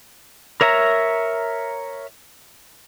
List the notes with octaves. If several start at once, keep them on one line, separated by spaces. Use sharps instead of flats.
A#4 C#5 E5 A#5